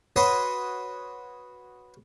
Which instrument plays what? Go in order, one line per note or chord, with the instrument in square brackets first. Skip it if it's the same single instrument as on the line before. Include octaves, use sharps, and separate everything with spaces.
[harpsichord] F#4 B4 C#5 C6 D#6